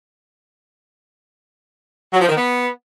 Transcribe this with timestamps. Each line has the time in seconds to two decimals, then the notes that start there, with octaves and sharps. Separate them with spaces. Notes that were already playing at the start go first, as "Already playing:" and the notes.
2.13 F#3
2.21 F3
2.28 D#3
2.36 B3